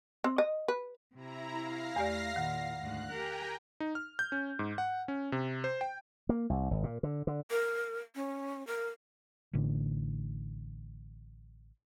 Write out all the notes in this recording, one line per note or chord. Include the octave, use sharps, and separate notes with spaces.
C4
D#5
B4
C3 E4 A#5
F5 A#6 C7
E2 A3 G4 D5
A#2 D#3 F#5
D2 G#2 F#6
G4 A#4 G5 G#5 A#5
D#4
F6
G6
C#4
G#2
F#5
C#4
C3
C5
G5
A#3
C2
G#1
A#2
D3
D3
A#4
C#4
A#4
A1 A2 D3